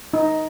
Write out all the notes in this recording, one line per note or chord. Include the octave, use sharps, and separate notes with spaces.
D#4